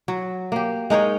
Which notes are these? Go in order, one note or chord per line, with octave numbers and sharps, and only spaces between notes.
F#3
A#3 G4
G#3 D#4 A#4 C#5